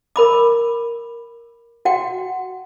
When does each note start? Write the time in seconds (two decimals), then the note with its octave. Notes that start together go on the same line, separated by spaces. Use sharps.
0.16 A#4 B5 D6
1.85 F#4 F#5 G5